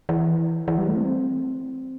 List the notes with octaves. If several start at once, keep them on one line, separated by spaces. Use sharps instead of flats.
E3
E3
G3
A3
C4